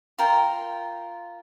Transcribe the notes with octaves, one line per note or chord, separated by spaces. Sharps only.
F4 A#4 G5